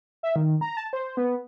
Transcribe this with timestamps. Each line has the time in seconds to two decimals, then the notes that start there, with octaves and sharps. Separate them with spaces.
0.23 E5
0.36 D#3
0.61 A#5
0.77 A5
0.93 C5
1.17 B3